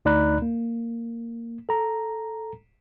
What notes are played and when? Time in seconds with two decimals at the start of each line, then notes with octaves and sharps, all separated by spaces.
0.05 D2 D#4 D5 A#5 B5 F#6
0.42 A#3
1.69 A4 A#5